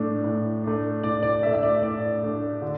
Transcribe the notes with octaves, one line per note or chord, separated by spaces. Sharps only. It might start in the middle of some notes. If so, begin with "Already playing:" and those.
Already playing: A2 A3 D4
A2
A3 D4
A2 D5
D5
A3 D4 E5
E5
D5
A2 D5
A3 D4
D3